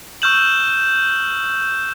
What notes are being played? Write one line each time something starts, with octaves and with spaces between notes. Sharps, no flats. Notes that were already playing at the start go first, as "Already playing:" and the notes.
C#6 E6 F6 G6 E7 F#7